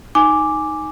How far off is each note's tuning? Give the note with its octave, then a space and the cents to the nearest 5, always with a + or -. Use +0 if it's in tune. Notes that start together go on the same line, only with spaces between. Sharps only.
D#4 +0 G#5 +0 D6 +0